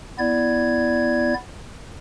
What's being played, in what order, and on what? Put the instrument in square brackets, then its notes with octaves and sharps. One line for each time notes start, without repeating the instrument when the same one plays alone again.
[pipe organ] B3 E4 D5 G#6